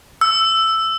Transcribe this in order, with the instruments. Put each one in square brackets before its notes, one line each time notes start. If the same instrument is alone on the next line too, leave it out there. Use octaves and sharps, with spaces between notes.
[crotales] E6